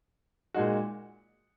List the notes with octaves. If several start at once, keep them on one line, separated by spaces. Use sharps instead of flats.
A#2 G#3 D#4 F#4